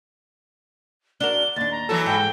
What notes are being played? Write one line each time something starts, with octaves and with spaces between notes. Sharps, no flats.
D4 F#4 A#4 G7
D#2 D4 A6
A#5
E3 F#3 A4
G#2 G5